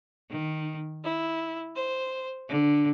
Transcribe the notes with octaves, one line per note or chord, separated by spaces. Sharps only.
D#3
E4
C5
D3